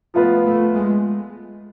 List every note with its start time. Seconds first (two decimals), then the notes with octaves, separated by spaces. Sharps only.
0.14 F3 A3 B3 F4 B4
0.44 A3
0.74 G#3